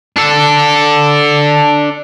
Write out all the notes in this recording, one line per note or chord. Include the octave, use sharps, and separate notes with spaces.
D4 A4